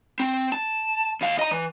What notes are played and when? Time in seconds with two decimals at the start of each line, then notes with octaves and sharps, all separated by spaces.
0.20 C4
0.52 A5
1.21 D#2 F5
1.39 D#5 A#5
1.51 E3